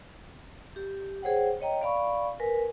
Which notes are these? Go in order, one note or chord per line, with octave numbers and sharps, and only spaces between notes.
G4
G#4 C5 C#5 F#5 G5
C#5 D#5 G5 A#5
D5 F5 B5 C#6
A#4 B4 G#5